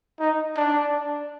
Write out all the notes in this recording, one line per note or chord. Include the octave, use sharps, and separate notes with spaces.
D#4
D4